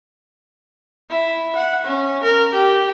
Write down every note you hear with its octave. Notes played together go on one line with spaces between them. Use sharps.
E4
F#5
C#4
A#4
G4